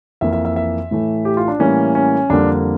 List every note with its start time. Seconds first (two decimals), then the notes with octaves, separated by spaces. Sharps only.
0.21 F2 E3 A#3 E5
0.33 E5
0.45 E5
0.56 E5
0.91 A2 E3 A3
1.25 G4
1.37 F4
1.48 D4
1.60 A2 E3 G3 A#3 C#4
1.95 C#4
2.30 F2 D3 G3 A#3 D4